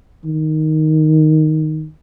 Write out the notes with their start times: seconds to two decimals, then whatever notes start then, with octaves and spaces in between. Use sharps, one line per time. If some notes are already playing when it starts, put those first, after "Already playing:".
0.25 D#3